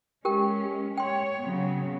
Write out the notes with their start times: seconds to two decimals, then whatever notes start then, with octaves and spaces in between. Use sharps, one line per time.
0.25 G#3 C#4 G4 A#4 G5
0.97 C#5 G5 C6
1.44 C#3 F#3 B3